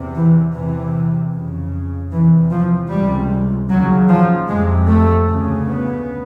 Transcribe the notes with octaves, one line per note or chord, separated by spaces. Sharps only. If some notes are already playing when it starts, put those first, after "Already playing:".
Already playing: E2 C3
E3
E2 C3 E3
F2 C#3
E2 C3 E3
F3
C#2 C3 G3
D#2 C#3 F#3
F3
F2 C3 G#3
A3
D2 C#3
B3